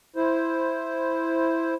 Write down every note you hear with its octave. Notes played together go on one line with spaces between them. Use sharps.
E4 C5